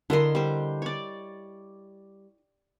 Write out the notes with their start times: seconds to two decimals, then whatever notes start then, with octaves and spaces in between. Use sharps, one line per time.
0.10 D3 E4 A#4 D#5 C6
0.35 G3 C5
0.82 C#5 D5